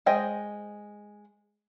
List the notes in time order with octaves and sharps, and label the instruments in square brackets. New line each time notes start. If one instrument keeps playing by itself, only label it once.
[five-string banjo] G#3 C5 D#5 G5 G#5